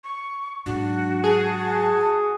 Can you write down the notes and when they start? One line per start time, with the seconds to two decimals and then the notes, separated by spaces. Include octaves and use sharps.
0.04 C#6
0.66 G#2 F#3 D4 F#4
1.24 G#4 A5